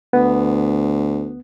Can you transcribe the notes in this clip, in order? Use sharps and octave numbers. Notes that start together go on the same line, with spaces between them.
D2 B3